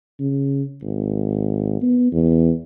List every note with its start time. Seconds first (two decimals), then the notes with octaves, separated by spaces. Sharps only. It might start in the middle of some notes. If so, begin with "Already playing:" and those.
0.20 C#3
0.83 G#1
1.82 B3
2.12 E2